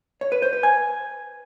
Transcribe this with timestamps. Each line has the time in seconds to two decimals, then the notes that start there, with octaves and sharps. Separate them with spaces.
0.21 C#5
0.32 B4
0.42 C5
0.53 B4
0.63 G#5